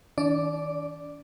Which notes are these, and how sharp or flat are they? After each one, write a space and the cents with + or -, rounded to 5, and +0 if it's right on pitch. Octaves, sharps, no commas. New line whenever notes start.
D#3 +35 D4 -40 D5 +0